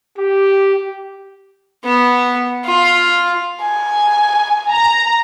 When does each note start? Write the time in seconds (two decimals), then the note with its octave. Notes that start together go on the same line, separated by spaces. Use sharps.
0.19 G4
1.84 B3
2.65 F4
3.61 G#5
4.69 A#5